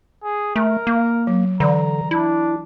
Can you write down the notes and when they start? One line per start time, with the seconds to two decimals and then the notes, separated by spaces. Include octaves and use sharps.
0.23 G#4
0.56 A3 A#4
0.87 A#3
1.27 F#3
1.60 D3 E3 D5 A#5
2.11 D4 E4